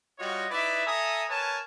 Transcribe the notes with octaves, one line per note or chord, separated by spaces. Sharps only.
G3 F4 F#4 C#5 D#5
D#4 E4 B4 D5 E5
A4 E5 G#5 A#5 D#6
A#4 B4 C#5 G#5 A5